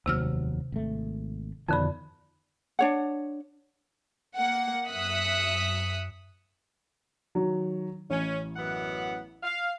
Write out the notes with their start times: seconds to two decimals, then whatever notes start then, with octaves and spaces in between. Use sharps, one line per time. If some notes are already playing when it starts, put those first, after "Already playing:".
0.06 F1 D#2 C3 F#3 E6 F6
0.72 G#1 A3
1.68 F2 B2 D3 D#3 F3 B5
2.79 D4 C#5 F#5
4.35 A#3 F#5
4.88 F#2 E5 D#6 F#6 B6 C#7
7.35 D#3 F#3
8.10 A1 C#4
8.55 F#2 B3 F#5
9.43 F5